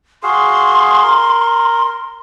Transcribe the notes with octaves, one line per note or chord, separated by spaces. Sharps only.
F#4 G#4 F5 C6
A#4